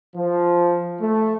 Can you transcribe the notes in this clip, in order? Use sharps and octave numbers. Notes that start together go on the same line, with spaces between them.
F3
A3